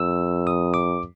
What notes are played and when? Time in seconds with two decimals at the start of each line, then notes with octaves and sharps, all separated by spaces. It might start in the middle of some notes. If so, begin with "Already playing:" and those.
Already playing: F2 E6
0.47 D#6
0.74 D6